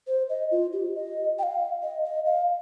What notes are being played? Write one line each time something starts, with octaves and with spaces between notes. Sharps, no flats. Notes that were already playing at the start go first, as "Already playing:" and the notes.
C5
D#5
F4
G4
D#5
G5
F5
D#5
D#5
F5